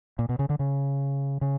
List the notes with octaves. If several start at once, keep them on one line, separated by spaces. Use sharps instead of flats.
A#2
B2
C#3
D3
C#3
C#3